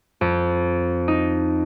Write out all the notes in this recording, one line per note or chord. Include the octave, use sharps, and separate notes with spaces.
F2
D#4